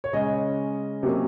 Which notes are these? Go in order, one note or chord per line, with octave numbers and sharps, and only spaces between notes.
C#5
C#3 G#3 C#4 D#5
C3 F#3 A#3 C#4